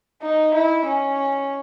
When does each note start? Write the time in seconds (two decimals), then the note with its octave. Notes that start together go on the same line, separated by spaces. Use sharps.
0.22 D#4
0.54 E4
0.86 C#4